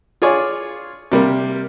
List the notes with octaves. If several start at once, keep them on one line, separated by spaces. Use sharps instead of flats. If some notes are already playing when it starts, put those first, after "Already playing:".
F4 G#4 C#5 D5 G#5 C#6
C3 G3 A#3